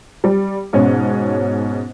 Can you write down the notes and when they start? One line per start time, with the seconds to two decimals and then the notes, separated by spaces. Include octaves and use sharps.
0.24 G3
0.73 G#2 B2 C#4